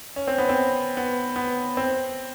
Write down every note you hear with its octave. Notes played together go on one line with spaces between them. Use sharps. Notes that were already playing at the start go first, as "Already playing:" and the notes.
C#4
C4
B3
C4
B3
B3
C4